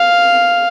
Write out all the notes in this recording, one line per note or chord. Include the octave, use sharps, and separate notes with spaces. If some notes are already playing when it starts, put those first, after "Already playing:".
Already playing: F5